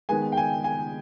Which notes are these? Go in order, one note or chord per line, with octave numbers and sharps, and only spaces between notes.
D#3 G#3 B3 G#5
G5
G#5
G#5